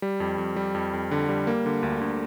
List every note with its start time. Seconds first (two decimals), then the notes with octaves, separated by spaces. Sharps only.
0.02 G3
0.20 F2
0.38 F2
0.56 G3
0.75 F2
0.93 F2
1.11 D3
1.29 G3
1.47 A#3
1.66 D3
1.83 D2
2.01 D2